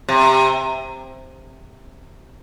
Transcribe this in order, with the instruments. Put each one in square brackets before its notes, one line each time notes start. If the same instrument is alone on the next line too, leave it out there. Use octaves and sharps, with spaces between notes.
[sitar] C3